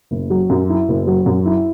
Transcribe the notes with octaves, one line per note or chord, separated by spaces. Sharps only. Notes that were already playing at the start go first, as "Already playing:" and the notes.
F#1
F#3
F#2
E4
F#1
F#3
F#2
E4